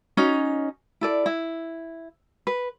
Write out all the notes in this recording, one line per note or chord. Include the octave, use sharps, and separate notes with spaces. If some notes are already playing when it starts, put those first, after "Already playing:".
C#4 D#4 F#4
E4 A4 D5
E4
B4